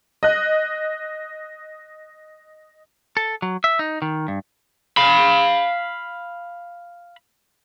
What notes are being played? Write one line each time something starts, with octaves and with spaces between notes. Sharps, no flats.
D#5 F#6
A4
F#3
E5
D#4
D#3
G2
F5 B5